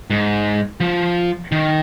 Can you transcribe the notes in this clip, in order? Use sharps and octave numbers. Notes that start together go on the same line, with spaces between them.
G#2
F3
D#3